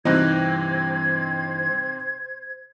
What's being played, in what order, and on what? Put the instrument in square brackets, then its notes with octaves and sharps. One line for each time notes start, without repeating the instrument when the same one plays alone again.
[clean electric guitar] G2 E3 [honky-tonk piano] C3 C4 D#4 [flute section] C5 G#6